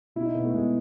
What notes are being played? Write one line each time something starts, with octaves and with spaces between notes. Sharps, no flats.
B2 E4
D#4
B2 B3
A3
B2 G#3